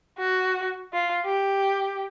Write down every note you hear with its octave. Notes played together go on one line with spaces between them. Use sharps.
F#4
F4
G4